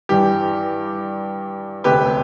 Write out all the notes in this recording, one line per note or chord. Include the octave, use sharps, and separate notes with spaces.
G2 E3 G3 G4
E1 D2 C3 G4 B4